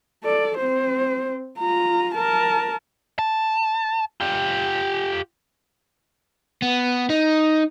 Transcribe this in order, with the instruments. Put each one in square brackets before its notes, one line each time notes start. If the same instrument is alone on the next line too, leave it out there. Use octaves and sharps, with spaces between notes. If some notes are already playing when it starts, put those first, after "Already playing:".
[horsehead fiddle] A4 D5
C4 C5
F4 A#5
A#4 A5
[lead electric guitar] A5
F4 G4
[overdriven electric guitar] B3
D#4